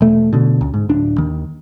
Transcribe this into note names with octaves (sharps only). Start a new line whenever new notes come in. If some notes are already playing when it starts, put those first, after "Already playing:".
E1 A3
B2 D3
C#2
G#2
D1 D4
D#2 D#3